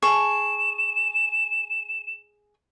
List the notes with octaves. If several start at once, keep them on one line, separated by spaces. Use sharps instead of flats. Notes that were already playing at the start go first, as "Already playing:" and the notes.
G#4 A5 C#6 E7